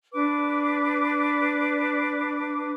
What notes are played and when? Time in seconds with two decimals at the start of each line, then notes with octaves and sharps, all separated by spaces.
0.12 D4 B4 D6